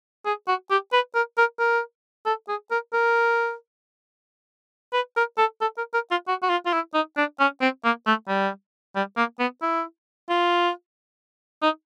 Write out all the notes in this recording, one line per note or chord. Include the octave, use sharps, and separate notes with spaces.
G#4
F#4
G4
B4
A#4
A#4
A#4
A4
G#4
A#4
A#4
B4
A#4
A4
A4
A#4
A#4
F4
F#4
F#4
F4
F4
E4
D#4
D4
C#4
C4
A#3
A3
G3
G3
A#3
B3
E4
F4
D#4